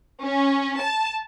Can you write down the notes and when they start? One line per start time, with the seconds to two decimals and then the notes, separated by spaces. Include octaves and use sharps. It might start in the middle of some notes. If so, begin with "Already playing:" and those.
0.23 C#4
0.80 A5